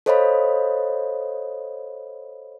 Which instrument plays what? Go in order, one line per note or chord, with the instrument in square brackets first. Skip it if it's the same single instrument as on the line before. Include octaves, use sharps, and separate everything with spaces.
[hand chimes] A4 C5 C#5 D#5 F5 B5